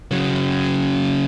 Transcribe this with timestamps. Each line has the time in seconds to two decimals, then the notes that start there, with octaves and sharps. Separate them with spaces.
0.11 C#3 F#3